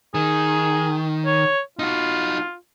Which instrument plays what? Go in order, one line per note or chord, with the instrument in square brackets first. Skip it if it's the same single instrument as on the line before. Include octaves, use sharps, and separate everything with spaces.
[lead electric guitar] D#3 [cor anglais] G#4
[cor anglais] C#5
[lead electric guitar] D#4 F#4 [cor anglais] F4